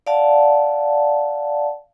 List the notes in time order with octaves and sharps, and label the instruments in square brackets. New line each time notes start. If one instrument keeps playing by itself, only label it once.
[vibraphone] D5 F5 F#5 A5